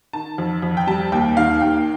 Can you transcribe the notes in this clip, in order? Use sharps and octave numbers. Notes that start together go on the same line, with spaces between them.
D#3 A5
F2
F2
G5
G3 A5
D#2 G5
D#3 F5
D#2 G5